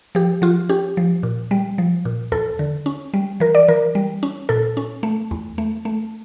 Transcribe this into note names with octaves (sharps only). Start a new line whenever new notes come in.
F3 G4
F3 F4
C#4 G4
F3
A#2
G3
F3
A#2
E2 A4
D3
C#4
G3
E3 A#4
D5
E3 A#4
G3
C#4
A#2 A4
C#4
A3
E2
A3
A3